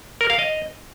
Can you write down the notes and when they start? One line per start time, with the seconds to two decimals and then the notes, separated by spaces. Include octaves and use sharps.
0.21 A#4
0.30 F5
0.39 D#5